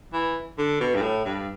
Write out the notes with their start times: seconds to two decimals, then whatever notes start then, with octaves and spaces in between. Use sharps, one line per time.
0.13 E3
0.58 D3
0.80 B2
0.95 G2
1.02 A2
1.25 G2